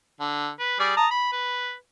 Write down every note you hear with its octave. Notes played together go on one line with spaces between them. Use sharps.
D3
B4
G3 G#4 D5
A5 A#5 D#6
B5
B4